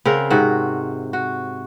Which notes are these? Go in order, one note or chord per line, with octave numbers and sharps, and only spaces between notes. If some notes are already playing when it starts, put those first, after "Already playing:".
C#3 C4 A#4 F#5
G#2 C3 F#4
F#4